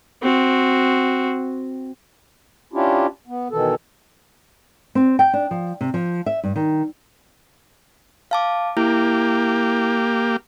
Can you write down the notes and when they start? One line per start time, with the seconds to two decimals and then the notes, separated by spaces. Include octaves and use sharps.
0.23 C4 F#4
2.73 C#4 D4 E4 F4 G4
3.27 B3
3.51 B2 D#3 E3 A4
4.95 C4
5.19 G5
5.33 D4
5.51 F3
5.81 C3
5.94 F3
6.26 E5
6.44 G2
6.56 D#3
8.31 F5 A5 D6
8.77 A#3 E4 G4